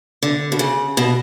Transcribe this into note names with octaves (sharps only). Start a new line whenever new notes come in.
D3
B2
C#3
B2